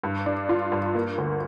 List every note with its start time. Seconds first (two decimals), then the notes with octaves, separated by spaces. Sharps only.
0.03 G2
0.26 D4
0.49 F4
0.72 G2
0.95 A#3
1.18 D2